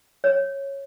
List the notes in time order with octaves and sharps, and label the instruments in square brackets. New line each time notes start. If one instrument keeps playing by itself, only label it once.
[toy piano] C#5